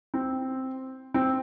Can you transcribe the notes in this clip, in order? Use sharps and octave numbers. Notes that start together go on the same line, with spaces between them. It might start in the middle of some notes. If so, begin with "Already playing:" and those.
C4
C4